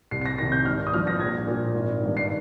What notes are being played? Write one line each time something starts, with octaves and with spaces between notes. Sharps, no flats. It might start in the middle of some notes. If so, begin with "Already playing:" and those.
C2 C7
C7
A#6
C3 D#3 A#6
G6
G#1 F6
D#6
G2 F3 F6
A#6
A#1 G#6
A#2 F3
G#1
G2 D#3
C7